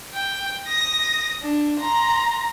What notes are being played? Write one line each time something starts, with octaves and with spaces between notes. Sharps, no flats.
G5
D#6 A#6
D4
A#5 C6